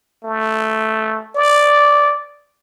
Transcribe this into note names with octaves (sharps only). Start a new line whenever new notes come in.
A3
D5